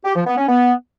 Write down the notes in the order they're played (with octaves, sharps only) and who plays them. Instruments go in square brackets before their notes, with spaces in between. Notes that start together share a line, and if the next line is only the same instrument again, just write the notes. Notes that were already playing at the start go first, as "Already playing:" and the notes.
[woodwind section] G4
F3
B3
C#4
B3